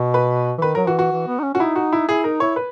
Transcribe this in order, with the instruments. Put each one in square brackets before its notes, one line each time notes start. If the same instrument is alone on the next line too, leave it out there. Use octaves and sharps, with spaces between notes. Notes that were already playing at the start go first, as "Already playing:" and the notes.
Already playing: [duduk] B2
[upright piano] B4
[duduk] E3
[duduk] D#3 [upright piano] B4
[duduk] F#3 [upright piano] A#4
[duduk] E3 [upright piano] F#4
[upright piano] F#4
[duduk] E3
B3
D#4
C#4
[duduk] C#4 [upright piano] F#4
[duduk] D#4 [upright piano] E4
[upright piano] F#4
E4
[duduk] E4 [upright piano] G#4
[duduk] D#4 [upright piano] A#4
[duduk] E4 [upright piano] C#5
[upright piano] B4